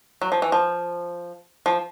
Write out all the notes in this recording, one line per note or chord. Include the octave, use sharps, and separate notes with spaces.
F#3
F3
E3
F3
F3